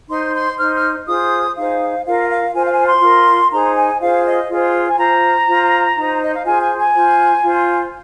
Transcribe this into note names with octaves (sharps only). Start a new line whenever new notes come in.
D#4 C5 C6
C6
D#4 C5 F6
F6
F4 G#4 C5 D#6
D#4 G#4 C5 F5
F4 A#4 F5
F5
F4 C5 G#5
F5
G#5
C6
F4 A#4
D#4 G#4 C5 A#5
G#5
F4 G#4 C5 F5
D#5
F4 G#4 C5
G#5
F4 C5 A#5
F4 C5
D#4 C5
D#5
F5
F4 G#4 C5 G#5
G#5
G#5
F4 C5
F4 C5